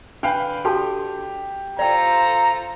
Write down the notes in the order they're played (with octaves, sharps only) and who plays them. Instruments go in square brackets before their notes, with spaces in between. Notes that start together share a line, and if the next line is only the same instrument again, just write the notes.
[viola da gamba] D3 [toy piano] D4 [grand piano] B4 F5 G5
[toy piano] F#4 A4 A5 [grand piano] G4
[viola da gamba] F4 A4 C5 [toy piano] D5 G5 [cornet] A#5